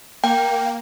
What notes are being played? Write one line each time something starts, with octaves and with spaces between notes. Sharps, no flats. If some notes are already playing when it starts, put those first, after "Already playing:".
A#3 G5